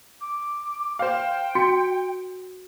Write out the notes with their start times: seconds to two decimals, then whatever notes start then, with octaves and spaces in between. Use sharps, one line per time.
0.21 D6
0.99 C5 F5 G5
1.55 F#4 C#7